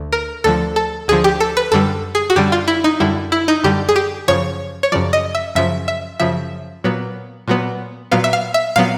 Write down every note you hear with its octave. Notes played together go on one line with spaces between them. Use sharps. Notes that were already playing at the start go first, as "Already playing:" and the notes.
Already playing: D2 D3
A#4
D2 D3 F3 A4
A4
D2 D3 F3 G#4
G4
A4
B4
F#2 D3 G3 A4
G#4
F#4
F#2 D3 G3 G4
F4
E4
D#4
F#2 D3 G3 E4
E4
D#4
F#2 D3 G3 G4
G#4
G4
F#2 C#3 F3 C#5
C#5
F#2 C#3 F3 D5
D#5
E5
F#2 C#3 F3 E5
E5
F#2 C#3 F3 E5
A#2 F#3 B3
A#2 F#3 B3
A#2 F#3 B3 F5
E5
F5
E5
A#2 F#3 B3 F5